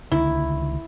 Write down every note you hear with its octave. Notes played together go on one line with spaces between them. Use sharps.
C#2 D3 D#3 E4